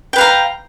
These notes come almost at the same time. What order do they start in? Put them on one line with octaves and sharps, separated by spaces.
G5 B4 F5 A#5